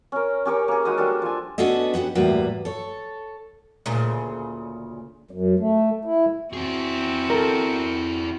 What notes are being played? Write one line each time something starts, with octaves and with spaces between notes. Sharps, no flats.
C#4 A#4
C#4 G4 A#4 C#5
A#3 G#4
G#3 D#4 F#4 D#6
G3 A#3 D4 A4
F3 G#5
B3 C#4 D4 F#4 A4 D#5
B3 C#4 F#4 G4
E2 A2 G3 A#3 F#4 B4
A4 C#5
D2 A#2 C#3
F#2
A3
E4
C4 E4 F#4 G#4
A4 A#4